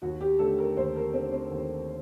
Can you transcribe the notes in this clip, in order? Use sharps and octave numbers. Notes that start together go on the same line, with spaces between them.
D#2 F#4
G4
D3 A3 A4
A#4
D#2 C5
A#4
D3 A3 C4
C4
D#2